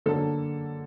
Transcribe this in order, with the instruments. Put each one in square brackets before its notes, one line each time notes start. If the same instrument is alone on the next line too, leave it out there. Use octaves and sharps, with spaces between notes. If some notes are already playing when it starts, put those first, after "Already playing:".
[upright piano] D3 F#3 A#3 A4